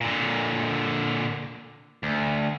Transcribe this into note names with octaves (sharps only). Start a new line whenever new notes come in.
A#2 D3
D2